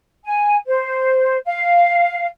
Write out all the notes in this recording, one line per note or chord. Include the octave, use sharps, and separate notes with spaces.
G#5
C5
F5